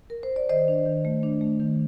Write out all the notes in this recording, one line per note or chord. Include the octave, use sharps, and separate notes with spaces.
A#4
C5
D5
D#3 C5 D#5
D4
D#3
A3
D4
A3
D#3